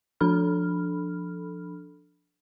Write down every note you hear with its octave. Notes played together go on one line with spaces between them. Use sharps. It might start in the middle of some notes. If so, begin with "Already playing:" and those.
F3 D4 A4 B5 F6